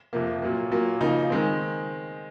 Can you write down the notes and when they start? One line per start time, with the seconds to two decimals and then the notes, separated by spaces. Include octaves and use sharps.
0.13 F2 C3 F3 A#3
0.42 A#2 F#3 A#3
0.71 A#2 F#3 A#3
1.01 C#3 F3 A#3 D#4
1.30 D#3 G#3 C4